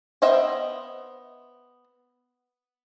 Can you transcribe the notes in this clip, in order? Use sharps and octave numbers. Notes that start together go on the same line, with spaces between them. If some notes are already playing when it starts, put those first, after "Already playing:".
B3 C5 D#5 E5 G5